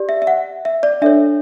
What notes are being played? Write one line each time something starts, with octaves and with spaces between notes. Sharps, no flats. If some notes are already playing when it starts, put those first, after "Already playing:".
Already playing: G4 D5
E5
E5
F#5
E5
D5
D4 A4 C#5 E5